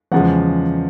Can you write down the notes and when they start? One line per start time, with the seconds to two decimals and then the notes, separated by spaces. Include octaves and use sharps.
0.12 E2 C#3 F3 G#3 F#5